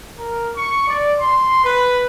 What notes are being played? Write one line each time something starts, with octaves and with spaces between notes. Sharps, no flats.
A#4
C#6
D5
C6
B4